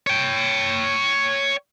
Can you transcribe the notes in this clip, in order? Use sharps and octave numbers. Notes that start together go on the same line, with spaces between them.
C#5 G5